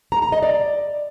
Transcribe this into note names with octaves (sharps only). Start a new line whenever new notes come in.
A#5
A#5
D#5
D5